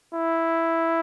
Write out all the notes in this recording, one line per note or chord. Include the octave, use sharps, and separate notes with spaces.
E4